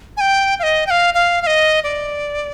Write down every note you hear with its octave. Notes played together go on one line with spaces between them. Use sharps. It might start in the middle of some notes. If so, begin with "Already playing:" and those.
G#5
G5
F5
D#5
G5
F5
F5
F5
D#5
D5